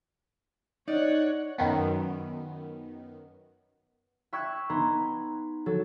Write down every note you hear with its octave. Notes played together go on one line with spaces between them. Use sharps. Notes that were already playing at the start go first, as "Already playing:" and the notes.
D#4 C#5 D5 F#5
F#2 D#3 B3
E5 G5 C#6 E6 F#6 G#6
B3 D#4 B4 A#5 C6 G#6
F#3 A4